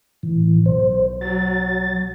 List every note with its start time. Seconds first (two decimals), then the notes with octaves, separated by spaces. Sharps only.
0.23 A2 E3
0.66 B1 C5
1.21 F#3 A6